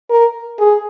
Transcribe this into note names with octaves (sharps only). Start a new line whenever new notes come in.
A#4
G#4